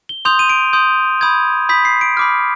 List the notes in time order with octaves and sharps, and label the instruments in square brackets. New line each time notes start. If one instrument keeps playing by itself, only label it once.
[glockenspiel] G7
C6 D#6 G6 F7
D#7
D7
C6 D#6 G6
B5 D#6 G6 G#6
B5 D#6 G6 B6
C7
D7
B5 D6 F6